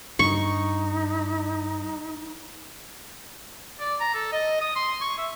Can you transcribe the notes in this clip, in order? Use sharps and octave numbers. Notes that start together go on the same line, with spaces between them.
G2 D#4 C#6
D5
A#5
A4
D#5
D#6
C6
C#6
E5